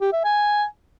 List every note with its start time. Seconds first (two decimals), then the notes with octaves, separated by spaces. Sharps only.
0.01 G4
0.13 E5
0.24 G#5